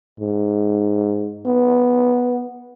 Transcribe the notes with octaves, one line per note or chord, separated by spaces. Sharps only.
G#2
B3